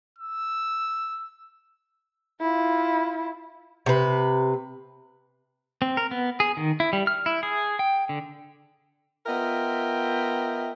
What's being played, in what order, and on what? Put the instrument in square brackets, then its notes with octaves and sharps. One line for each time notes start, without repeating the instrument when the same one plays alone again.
[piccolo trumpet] E6
[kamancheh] E4 F4
[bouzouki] C3 B4
[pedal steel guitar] C4
A#4
B3
G#4
D#3
E4
G3
F6
E4
G#4
G5
D3
[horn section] B3 F4 A#4 D#5 E5 G5